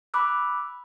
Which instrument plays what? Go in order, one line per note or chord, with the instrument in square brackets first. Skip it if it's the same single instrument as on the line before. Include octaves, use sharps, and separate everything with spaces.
[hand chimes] B5 D6 E6 F#6